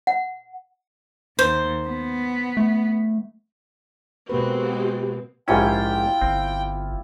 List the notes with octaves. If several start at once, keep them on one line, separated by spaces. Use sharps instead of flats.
F#5
D#2 C5
B3
A3
B2 G#3 A#3 C4 F#4 G4 B4
A#1 G#2 C#4 E4 F4 G4 G5
G1 C4